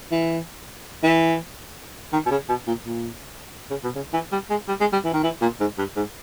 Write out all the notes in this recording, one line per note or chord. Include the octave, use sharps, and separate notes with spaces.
E3
E3
D#3
B2
C#3
B2
A#2
A#2
C#3
B2
C#3
E3
G3
G#3
G3
G#3
G3
E3
D#3
E3
A#2
G#2
G2
G#2